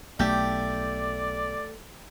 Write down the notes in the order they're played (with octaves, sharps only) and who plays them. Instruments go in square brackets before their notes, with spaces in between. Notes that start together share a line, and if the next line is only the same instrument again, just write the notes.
[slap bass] B1 [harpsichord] A3 [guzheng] G4 [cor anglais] D5